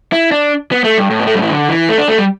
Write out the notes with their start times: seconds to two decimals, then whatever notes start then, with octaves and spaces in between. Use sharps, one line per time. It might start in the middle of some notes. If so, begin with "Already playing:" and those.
0.13 E4
0.32 D4
0.72 B3
0.84 A3
0.98 G2
1.10 A2
1.19 B3
1.27 A3
1.35 G3
1.42 E3
1.49 D3
1.69 E3
1.89 A3
1.98 D4
2.08 A3
2.18 G3